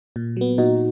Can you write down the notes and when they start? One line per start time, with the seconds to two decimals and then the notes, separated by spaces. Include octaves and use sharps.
0.16 A#2
0.37 F#3 B3
0.58 A#2 D#4 F#4